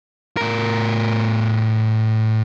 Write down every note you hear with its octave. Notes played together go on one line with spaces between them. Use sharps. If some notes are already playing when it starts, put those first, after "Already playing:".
A2 A#4